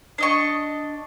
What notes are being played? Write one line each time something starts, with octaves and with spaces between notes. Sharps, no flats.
D4 D#5 C#6